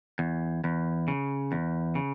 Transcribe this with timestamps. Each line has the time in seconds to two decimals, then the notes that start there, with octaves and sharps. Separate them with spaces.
0.19 E2
0.64 E2
1.08 C#3
1.52 E2
1.95 C#3